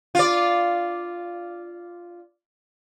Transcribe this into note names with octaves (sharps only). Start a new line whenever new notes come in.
F4 D5